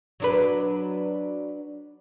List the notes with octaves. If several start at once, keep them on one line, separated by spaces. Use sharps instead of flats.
F#3 D4 B4